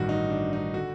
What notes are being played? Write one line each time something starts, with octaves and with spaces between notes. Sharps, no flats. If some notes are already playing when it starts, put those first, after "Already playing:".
Already playing: A1 G2 D#3 F#4
D#4
D4
D#4
D3 F#4